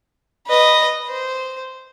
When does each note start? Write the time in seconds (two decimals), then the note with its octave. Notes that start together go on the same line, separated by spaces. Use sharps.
0.46 B4 D#5
1.08 C5